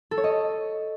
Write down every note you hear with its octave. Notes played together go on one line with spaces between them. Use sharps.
A4
C#5
D#5